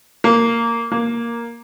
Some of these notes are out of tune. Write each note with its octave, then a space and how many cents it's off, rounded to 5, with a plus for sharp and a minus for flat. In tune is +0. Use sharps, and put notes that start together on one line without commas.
A#3 -15
A#3 +0